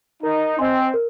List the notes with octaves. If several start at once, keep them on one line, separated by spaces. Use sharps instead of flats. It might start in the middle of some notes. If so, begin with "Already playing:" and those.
D#4 A#4
C4 D#5 G#5 C6
A#4